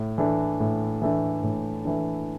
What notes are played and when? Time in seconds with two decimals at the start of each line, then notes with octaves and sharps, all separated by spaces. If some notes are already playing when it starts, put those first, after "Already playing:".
Already playing: A2
0.18 E3 A3 D4
0.60 A2
1.02 E3 A3 D4
1.43 A2
1.85 E3 A3 D4